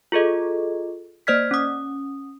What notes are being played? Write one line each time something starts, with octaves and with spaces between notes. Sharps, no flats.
F4 G#4 A4 D#5
A#3 C5 D5 F6 G#6 B6
C#4 D#6